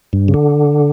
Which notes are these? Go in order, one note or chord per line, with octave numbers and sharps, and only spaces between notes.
G2
C#3
D3